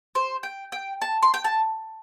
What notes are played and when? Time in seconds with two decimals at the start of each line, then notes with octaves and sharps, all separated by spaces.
0.15 C5
0.43 G5
0.72 G5
1.02 A5
1.23 C6
1.34 G5
1.44 A5